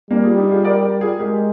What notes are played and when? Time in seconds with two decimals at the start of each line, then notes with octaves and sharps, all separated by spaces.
0.10 G3 A#3 D4
0.23 F4 G#4
0.37 D#4 G4
0.51 F4 G#4
0.65 A#4 D5
0.83 G4 A#4
1.01 F4 G#4
1.19 G#3 G4 A#4